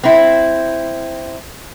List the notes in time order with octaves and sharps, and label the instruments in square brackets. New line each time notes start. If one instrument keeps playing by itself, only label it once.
[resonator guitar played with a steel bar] C4 E4